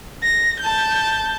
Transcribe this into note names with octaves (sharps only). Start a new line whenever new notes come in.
A#6
A5 G6